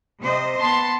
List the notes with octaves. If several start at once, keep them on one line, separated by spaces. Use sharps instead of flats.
C3 C5 D#5
B3 A5 C6